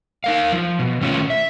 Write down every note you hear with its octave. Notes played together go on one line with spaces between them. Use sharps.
D#4 A#4 F5
F3
B2
D#3 A3 C#4 F4 C#5
E5